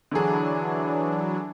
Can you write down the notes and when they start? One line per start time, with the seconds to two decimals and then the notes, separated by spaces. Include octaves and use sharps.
0.11 D3 E3 F#3 D4 G#4